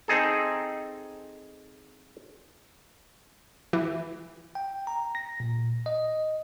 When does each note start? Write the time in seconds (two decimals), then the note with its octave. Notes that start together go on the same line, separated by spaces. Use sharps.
0.08 C4 D#4 G#4 A4
3.73 E3
4.55 G5
4.87 A#5
5.15 A#6
5.40 A#2
5.86 D#5